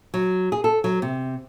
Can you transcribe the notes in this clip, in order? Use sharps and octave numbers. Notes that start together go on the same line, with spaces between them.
F#3
G#4
A4
F#3
C3